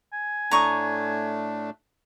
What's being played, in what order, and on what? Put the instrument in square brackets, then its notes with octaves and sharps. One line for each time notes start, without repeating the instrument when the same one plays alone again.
[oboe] G#5
[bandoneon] A2 A3 D4 [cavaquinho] A#5 C#6 D#6